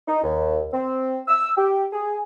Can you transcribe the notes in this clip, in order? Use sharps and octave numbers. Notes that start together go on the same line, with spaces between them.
D#4
D#2
C4
E6
G4
G#4